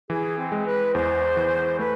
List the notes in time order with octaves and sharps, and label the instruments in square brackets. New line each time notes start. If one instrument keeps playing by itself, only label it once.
[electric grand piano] E3 [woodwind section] G#4
[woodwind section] C4
[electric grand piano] G#3
[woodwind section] B4
[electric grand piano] E2 [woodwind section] C5
[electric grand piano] E3
[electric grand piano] A3 [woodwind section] B4